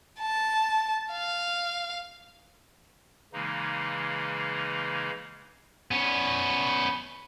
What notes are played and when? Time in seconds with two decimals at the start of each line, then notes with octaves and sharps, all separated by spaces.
0.20 A5
1.13 F5
3.33 C#3 E3 G#3 A#3 D#4
5.91 B3 C#4